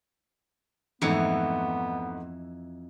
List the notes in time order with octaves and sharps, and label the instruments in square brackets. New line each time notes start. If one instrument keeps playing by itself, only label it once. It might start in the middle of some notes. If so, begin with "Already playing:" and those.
[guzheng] F2 E3 D#4 [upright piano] G#2 A3 C#7 [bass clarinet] B3